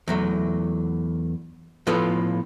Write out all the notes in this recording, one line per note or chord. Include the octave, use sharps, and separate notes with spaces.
E2 F#3 A3
A2 F3 B3 F4 A4 B4